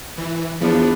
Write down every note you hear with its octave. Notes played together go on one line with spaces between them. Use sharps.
E3
E2 F3 B3 D4